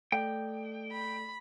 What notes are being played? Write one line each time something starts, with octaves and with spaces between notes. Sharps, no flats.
A3 A4 D5 G5
B5